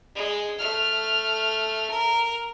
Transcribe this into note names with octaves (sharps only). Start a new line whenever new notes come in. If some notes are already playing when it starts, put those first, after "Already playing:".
G#3
A3 F6
A#4